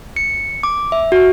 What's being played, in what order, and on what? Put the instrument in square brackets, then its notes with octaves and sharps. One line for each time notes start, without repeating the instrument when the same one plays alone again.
[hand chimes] C#7
D6
E5
F#4